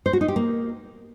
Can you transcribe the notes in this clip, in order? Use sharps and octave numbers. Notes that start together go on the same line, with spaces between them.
C5
F#4
D#4
G4
A#3